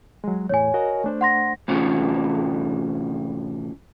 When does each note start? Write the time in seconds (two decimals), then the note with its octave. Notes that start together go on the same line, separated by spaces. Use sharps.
0.24 F#3 G#3
0.49 E2 A2 C#5 G#5
0.74 F#4 A#4 D#5
1.04 A3 D4 C5
1.21 F#5 C6 A#6
1.68 A2 C3 E3 C#4 F4